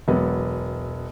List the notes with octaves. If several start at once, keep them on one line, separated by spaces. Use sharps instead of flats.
E1 F#3 B3